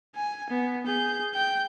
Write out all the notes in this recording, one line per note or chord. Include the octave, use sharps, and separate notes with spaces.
G#5
B3
G#4 G6
G5 G6